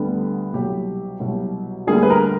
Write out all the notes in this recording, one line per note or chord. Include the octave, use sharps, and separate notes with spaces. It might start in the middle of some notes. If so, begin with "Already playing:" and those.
Already playing: D2 D3 G3 B3
C2 B2 F#3 G4
C2 B2 F#3
D2 D3 G3 A#3 G#4
B4
A#4